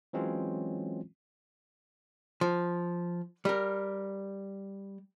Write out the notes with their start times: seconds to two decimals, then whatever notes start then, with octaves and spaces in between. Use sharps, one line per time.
0.13 E3 F#3 G#3 C4 C#4 F4
2.41 F3
3.45 G3 A#4